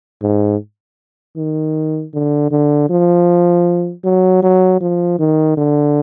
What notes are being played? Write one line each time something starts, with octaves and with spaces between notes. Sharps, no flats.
G#2
D#3
D3
D3
F3
F#3
F#3
F3
D#3
D3